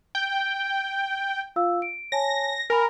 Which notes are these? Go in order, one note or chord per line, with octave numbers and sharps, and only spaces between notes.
G5
F4 F5 E6
D7
C#5 G#5 A5 A#6
A#4 G#5 B5